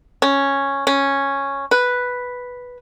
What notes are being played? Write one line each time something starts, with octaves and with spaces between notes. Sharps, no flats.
C#4
C#4
B4